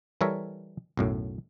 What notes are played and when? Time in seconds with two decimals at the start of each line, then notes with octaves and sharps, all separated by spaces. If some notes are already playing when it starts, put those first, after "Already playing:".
0.21 E3 G3 A4 A#4 C#5 E5
0.97 B1 F#2 A2